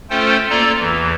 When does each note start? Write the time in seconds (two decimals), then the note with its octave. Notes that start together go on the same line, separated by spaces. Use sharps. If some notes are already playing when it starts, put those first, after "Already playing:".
0.10 A3 C#4 F4 A4 C5 G5
0.50 A#3 F4 A4 D5 A#5
0.80 E2 E3